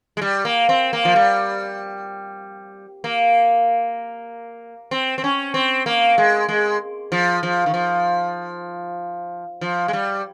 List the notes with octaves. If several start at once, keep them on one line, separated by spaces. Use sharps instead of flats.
G#3
G3
A#3
C4
A#3
F3
G3
A#3
C4
C4
C#4
C4
A#3
G#3
G#3
F3
F3
D#3
F3
F3
G#3
G3